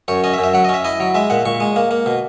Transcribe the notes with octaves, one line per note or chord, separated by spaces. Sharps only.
F#2 C#5
C#4 D#5
E5
F#2
E5
F#3 F#5
D#5
C#4
E5
E4 D#5
F#3
G#3 E5
A#2 F#5
A#2 C#6
G#3
A#3
A#3
B2